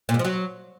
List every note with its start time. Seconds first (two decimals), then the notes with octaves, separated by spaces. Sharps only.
0.09 A#2
0.14 G#2
0.19 F3
0.25 F#3